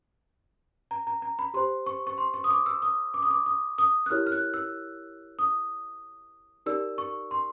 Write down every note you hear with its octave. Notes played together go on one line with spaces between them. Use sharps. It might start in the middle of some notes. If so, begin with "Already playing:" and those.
A#5
A#5
A#5
B5
G4 C5 C6
C#6
C#6
C6
C#6
D#6
D6
E6
D#6
D6
D#6
D6
D#6
D#6
F#6
E4 G4 A#4 C#5 F6
F6
F#6
E6
D#6
D#4 G4 A#4 D5 E6
C#6
C6